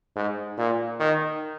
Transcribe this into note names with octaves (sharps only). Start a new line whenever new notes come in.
G#2
A#2
D#3